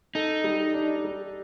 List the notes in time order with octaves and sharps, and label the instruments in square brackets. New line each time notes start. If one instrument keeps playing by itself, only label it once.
[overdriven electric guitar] D#4 [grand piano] A4
[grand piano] G3
D4
G3